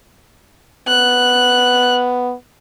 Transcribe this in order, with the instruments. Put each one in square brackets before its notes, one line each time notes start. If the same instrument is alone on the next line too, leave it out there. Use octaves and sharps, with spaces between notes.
[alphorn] B3 [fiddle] F#6